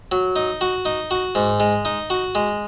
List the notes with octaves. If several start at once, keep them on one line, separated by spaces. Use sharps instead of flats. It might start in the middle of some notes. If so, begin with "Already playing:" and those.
F#3
D#4
F#4
D#4
F#4
G#2
G#3
D#4
F#4
G#3